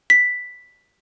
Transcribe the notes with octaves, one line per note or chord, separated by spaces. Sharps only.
B6